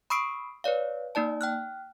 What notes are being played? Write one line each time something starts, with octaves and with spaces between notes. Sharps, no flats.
B5 C#6 D#6 E6 C7 D7
B4 C#5 D5 F5
A#3 D#4 D5 A5
G5 F6 F#6